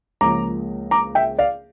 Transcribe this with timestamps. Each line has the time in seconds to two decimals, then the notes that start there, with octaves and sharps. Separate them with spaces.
0.21 C#2 C#3 F3 A#3 A#5 D6
0.91 A#5 D6
1.15 E5 G5
1.38 D5 F5